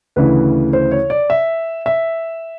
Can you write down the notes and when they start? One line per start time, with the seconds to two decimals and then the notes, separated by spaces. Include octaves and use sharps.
0.16 D2 C#3 E3 B4
0.73 C5
0.91 C#5
1.10 D5
1.30 E5
1.86 E5